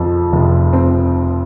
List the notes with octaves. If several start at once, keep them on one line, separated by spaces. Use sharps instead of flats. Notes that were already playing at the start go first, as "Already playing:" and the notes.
Already playing: F2 F3
F1
C4